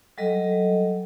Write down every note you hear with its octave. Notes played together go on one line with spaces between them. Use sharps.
F#3 G3 A4 D#5